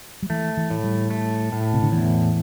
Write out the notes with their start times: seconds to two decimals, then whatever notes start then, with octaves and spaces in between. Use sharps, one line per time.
0.23 G3
0.30 E3 A3
0.57 E3
0.70 A2
0.84 G3
1.10 A3
1.52 A2
1.73 C3
1.83 D3
1.92 E2 E3